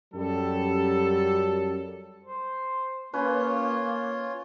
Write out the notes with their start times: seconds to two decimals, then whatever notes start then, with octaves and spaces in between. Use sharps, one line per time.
0.14 F#2 F#3 G3 A4
2.24 C5
3.13 A#3 C#4 F4 B4 C#5